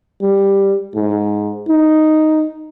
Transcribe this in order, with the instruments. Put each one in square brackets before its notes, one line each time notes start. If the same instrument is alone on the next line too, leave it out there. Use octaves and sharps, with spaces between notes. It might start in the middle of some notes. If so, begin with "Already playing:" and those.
[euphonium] G3
G#2
D#4